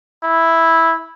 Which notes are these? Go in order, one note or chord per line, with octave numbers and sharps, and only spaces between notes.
E4